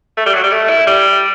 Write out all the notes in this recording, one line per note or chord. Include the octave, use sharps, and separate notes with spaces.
A3
G3
F#3
G3
A3
E4
G3